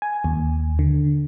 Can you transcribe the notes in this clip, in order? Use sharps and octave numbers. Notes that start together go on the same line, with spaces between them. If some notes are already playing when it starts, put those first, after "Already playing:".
G#5
D#2
D3